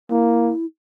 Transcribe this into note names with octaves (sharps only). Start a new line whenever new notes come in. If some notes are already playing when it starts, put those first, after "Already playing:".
A#3 E4